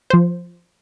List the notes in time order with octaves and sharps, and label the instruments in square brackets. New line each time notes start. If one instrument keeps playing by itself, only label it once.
[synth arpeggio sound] F3 C5